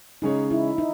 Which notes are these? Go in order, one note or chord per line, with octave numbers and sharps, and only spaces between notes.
C#3 G#3 C#4 D#4 G#4 C#5
E4
D#4